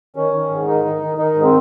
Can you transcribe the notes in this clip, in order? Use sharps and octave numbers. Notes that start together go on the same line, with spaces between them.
D#3 C#4
D#3
G#2
D#3 D#4
D#3
D#3
D#3 D#4
G#2
C4